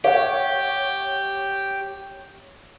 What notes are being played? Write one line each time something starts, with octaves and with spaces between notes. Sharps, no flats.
G4 C#5 E5 F#5